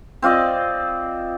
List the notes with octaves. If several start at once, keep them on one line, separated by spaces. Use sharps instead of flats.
C4 F4 D5 D#5